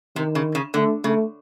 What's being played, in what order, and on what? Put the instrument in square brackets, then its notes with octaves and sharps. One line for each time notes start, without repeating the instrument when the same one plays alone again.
[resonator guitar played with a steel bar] C3 [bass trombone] D#3
[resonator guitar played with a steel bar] C#3
C#3
[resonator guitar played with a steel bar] D3 [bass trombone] A3
[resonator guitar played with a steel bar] C#3 [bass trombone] A3